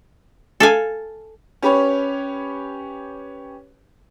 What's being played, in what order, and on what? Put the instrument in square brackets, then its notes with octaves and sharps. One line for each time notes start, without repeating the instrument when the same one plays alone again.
[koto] A4 F5 G#5
[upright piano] C#4 G4 B4 C#5